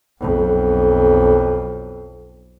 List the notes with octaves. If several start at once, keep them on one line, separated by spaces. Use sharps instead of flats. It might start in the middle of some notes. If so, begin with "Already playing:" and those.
B1 F2